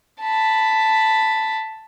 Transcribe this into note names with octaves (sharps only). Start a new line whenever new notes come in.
A5 B5